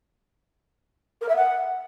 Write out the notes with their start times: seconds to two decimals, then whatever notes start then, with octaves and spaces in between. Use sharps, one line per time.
1.21 A#4
1.29 E5
1.36 F#5